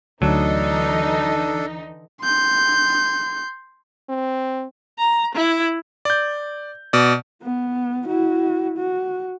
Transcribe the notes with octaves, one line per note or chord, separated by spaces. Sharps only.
D2 D3 E3 F#3 D4 D#4 A4
C6 G6
C4
A#5
E4
D5 G6
B2 D5
B3
E4 F#4
F#4